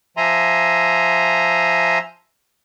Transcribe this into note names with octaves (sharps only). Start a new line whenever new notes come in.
F3 E5 G#5 A#5 C6